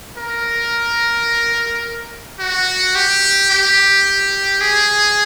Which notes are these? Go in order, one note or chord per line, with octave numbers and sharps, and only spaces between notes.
A#4
F#4
G4
G4
G#4